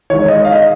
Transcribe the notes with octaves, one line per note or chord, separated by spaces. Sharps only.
D#3 G#3 C#5
D#5
F5
D#5